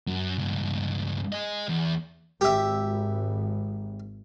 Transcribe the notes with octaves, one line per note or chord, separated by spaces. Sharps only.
F#2
C#2 G2
G#4 D#5
E2
G#1 G4 E5